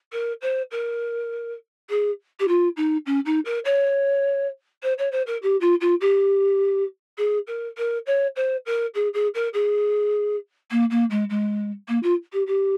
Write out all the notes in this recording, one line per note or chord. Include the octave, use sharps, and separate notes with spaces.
A#4
C5
A#4
G#4
G4
F4
D#4
C#4
D#4
A#4
C#5
C5
C#5
C5
A#4
G4
F4
F4
G4
G#4
A#4
A#4
C#5
C5
A#4
G#4
G#4
A#4
G#4
A#3
A#3
G#3
G#3
A#3
F4
G4
G4